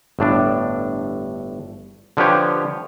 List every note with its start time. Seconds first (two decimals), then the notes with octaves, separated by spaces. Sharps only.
0.19 G1 A2 D4
2.17 D3 F3 G4 B4 C#5 G5